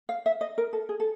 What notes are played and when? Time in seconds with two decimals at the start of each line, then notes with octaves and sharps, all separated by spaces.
0.09 F5
0.26 E5
0.41 D#5
0.58 A#4
0.73 A4
0.89 G#4
1.00 A4